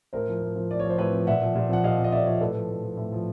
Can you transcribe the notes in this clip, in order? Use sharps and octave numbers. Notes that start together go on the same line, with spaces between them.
A2 A#4 C5
F3
A2
F3
A2 D5
C#5
F3
C5
A2 B4 C#5
F3
A#2 E5 F#5
F3
A#2
F3 F#5
A#2 D#5 F5
F3
D#5
A#2 D5 E5
F3 C#5 D#5
A2 A4 B4
F3
A2
F3
A2
F3